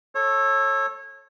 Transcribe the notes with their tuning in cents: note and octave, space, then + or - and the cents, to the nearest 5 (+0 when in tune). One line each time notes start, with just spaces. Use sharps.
A4 +0 C#5 -25